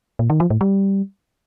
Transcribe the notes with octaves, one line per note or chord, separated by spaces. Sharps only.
A#2
D#3
F3
A2
G3